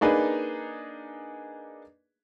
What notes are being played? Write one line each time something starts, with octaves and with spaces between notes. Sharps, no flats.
A#3 D4 D#4 G#4 B4